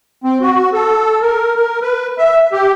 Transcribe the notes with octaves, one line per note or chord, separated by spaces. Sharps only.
C4
F#4
A4
A#4
A#4
B4
E5
G4